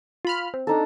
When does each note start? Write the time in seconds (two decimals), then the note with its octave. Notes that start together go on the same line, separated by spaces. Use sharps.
0.25 F4 B5 F6
0.54 C4
0.67 D4 D#4 A4